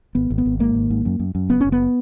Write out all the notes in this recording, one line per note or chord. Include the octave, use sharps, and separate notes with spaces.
G#1 B3
G#1
B3
G#1
G#2 A#3
G#1
G#2
F#2
F#2
F#2
F#1 B3
F#1 C#4
B3